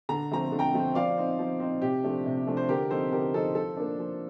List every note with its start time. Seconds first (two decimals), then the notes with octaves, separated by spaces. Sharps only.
0.09 D3 A#5
0.31 F3 A3 C4 A#5
0.52 D3
0.59 G5 A#5
0.74 F3 A3 C4
0.95 F3 D5 F5
1.18 C4 D#4
1.39 F3
1.60 C4 D#4
1.82 C3 G4
2.04 F3 A3 D4
2.26 C3
2.47 F3 A3 D4
2.57 C5
2.69 D3 G4 A#4
2.90 F3 C4 D#4 A4 C5
3.11 D3 G4 A#4
3.34 F3 C4 D#4 A4
3.55 F3 A4
3.77 A#3 D4
3.99 F3